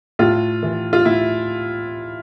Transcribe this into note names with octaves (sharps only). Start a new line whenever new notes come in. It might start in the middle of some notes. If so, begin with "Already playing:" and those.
A2 F4
E3
F4
A2 E4